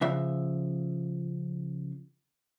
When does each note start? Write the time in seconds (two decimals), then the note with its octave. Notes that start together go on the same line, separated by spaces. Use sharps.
0.01 C#3 F3 E5